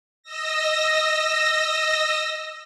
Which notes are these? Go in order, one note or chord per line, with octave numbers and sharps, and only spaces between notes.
D#5 E6 A#6